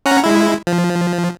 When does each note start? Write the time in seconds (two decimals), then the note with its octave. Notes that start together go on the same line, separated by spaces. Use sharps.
0.06 C#4 F#5 A#5
0.24 G#3 E4
0.67 F3